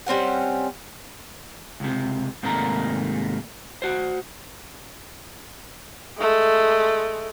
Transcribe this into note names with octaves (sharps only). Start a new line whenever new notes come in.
G3 C4 C#4 F#5
C#2 C3
G#2 C3 D#3 A3 A#3 A#5
F#4 C5
G#3 A3